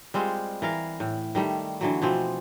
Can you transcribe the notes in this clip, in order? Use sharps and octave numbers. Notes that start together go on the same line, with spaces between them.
G3 G#3 C4 F4
E3 A#4 F5
A2
D#3 G3 A3
D3 E3 F#3
B2 E3 F3 C4